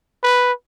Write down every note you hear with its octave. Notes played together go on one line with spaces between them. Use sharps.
B4